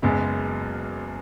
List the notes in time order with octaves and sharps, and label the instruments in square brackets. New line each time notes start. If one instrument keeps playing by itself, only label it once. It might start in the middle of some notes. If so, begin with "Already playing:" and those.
[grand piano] F#1 F#2 C#3 G#3 B3